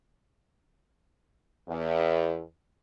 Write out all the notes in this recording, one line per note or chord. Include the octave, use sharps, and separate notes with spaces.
E2